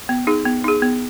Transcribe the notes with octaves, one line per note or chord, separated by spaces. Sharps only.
B3
D#4 G#4
B3
D#4 G#4
B3